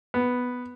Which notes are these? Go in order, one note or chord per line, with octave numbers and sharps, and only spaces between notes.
B3